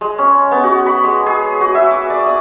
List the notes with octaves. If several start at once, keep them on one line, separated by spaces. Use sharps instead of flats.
G#3
C#4
B3
F#4
B5
G#3
G#4
F#4
E5
D6
D5
D#6